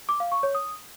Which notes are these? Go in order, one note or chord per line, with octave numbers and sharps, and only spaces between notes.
D6
F5
C#6
C#5
D#6